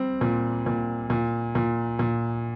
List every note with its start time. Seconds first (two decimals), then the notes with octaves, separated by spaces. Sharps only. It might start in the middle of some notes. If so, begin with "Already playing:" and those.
Already playing: G3 C4
0.21 A#2
0.66 A#2
1.10 A#2
1.55 A#2
1.99 A#2